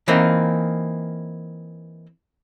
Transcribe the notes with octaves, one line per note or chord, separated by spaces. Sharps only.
E3 A#3 C4 D#4